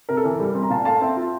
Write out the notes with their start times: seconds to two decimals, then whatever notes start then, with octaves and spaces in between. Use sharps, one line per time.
0.09 C3 A#4
0.17 A4
0.24 E3 A#4
0.40 G3
0.55 C4
0.63 A#5
0.70 A#2 F5 A5
0.85 A3 F5 A5
1.01 C4 E5 G5
1.17 F4